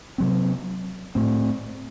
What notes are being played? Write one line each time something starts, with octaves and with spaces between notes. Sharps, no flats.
C3 F#3 C4
A2 A3 C4